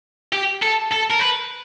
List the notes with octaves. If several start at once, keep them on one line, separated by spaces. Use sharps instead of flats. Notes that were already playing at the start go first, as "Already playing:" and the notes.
G4
A4
A4
A#4
B4